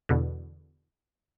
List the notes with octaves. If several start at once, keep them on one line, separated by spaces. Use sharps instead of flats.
E2 B2 D3